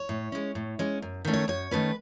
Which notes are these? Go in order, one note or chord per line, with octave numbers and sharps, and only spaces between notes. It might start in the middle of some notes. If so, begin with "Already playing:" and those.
Already playing: C#5
A2
G#3 C#4
A2
G#3 C#4
F#2
D#3 A3 C#4
C#5
F#2 C#5
D#3 A3 C#4 B4